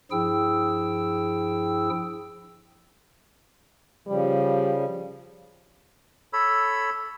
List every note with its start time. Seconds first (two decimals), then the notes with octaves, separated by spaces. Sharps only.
0.11 G2 F3 E4 G#4 G5 E6
4.08 C#3 F3 G3
6.33 A4 C#5 B5 E6